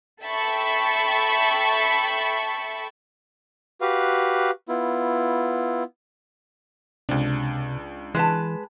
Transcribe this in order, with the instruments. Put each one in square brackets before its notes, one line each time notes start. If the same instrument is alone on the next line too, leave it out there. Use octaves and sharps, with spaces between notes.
[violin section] A4 E5 G5 A5 B5 C#6
[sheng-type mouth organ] F#4 G4 B4 F5
B3 E4 F4
[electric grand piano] C#2 D4 [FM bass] C3
[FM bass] E3 [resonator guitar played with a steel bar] G#3 B4 A5